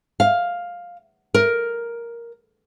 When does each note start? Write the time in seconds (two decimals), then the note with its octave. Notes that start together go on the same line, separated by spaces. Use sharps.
0.20 F5
1.34 A#4